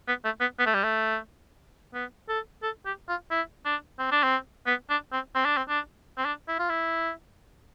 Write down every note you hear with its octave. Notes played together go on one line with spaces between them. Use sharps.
B3
A3
B3
B3
A3
G3
A3
B3
A4
A4
G4
F4
E4
D4
C4
D4
C4
B3
D4
C4
C4
D4
C4
D4
C4
D4
E4
F4
E4